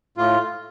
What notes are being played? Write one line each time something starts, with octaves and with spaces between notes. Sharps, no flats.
A2 F4